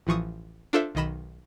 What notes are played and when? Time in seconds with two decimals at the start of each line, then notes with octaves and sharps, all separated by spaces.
0.07 A1 E3 F3 C#6 D#6
0.73 D4 F4 A4 C5 E5
0.95 B1 D#3 D#5 B5 E7